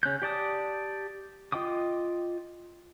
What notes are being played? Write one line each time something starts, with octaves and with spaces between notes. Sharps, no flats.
C#3 C#4 F#6 G6
G4 D5 A5 D#6
F4 D#5 G5 D6 D#6